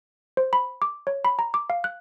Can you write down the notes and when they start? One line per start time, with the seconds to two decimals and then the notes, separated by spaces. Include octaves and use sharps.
0.37 C5
0.53 B5
0.82 D6
1.07 C#5
1.25 B5
1.39 A#5
1.54 D6
1.70 F5
1.84 F#6